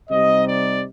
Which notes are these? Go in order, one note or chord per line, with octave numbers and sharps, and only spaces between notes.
C3 G3 C4 D#4 D#5
D5